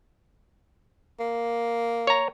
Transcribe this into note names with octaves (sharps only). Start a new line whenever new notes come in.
A#3
C#5 A#5